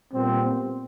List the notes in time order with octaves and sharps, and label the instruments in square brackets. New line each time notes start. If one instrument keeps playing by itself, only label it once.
[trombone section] A#2 G3 B3 C4